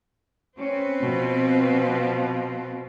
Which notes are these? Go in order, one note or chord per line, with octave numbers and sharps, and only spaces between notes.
C4 C#4 B4
B2 F3